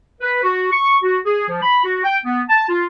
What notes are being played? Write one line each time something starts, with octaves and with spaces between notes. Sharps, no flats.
B4
F#4
C#6
F#4
G#4
F3
B5
F#4
G5
B3
A5
F4